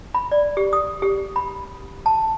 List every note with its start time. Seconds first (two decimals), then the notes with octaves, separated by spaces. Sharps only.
0.15 B5
0.31 D5
0.57 G4
0.73 D#6
1.02 G4
1.36 B5
2.06 A5